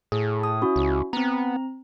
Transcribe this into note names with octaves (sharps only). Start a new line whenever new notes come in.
A2 G#4
D#6
C#4 E4 F#4
C#2
B3 C4 A#5